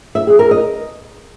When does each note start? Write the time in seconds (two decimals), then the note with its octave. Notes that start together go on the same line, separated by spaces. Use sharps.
0.15 E5
0.27 G#4
0.39 A#4
0.51 D#5